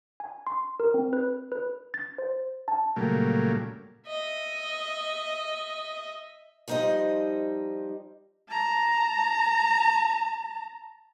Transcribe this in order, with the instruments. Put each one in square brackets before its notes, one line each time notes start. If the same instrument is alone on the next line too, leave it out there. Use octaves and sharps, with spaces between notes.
[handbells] G#5
C6
A#4
C4
B4
B4
A6
C5
A5
[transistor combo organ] A#2 C#3 F#3 G3 A3 A#3
[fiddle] D#5 E5
[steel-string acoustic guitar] F3 G3 D#4 C5 D#5
[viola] A5 A#5